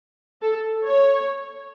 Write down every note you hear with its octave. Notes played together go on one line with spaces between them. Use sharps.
A4
C#5